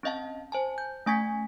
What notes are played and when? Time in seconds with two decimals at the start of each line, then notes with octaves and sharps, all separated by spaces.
0.03 C4 C#4 D#5 F5 A5
0.52 C5 G#5 A5
0.78 G6
1.06 A3 C#4 G#5 C#6 G#6 B6